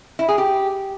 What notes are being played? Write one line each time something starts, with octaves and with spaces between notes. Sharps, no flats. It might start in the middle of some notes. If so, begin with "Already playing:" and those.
E4
G#4
G4